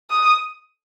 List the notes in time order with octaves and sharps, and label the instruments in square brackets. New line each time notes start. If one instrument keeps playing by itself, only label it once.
[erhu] D#6